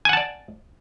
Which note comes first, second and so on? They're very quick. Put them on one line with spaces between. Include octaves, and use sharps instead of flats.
G#5 F#5 A5 D5